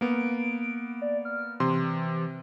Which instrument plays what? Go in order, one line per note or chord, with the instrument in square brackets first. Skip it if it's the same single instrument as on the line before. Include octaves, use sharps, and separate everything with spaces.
[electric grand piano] A#3 B3 [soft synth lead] D7
[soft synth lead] D5
F6
[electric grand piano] C3 C6 [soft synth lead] E3